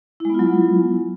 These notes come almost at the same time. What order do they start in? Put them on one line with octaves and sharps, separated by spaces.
E4 G#3 B3 F4 F#3